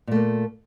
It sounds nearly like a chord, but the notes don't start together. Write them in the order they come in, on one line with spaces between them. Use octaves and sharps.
A#2 A3 A#3